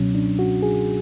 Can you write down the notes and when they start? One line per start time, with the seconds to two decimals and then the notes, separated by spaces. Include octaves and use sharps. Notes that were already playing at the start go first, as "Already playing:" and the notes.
Already playing: C#2 B2 F#3 C#4
0.15 D4
0.39 F#4
0.63 G#4